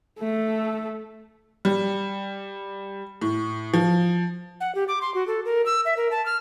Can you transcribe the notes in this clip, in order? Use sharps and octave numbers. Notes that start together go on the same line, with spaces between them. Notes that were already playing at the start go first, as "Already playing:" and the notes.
A3 A4
G3
A2
F3
F#5
G4
D6
C6
F#4
A4
A#4
E6
E5
A#4
A5
F6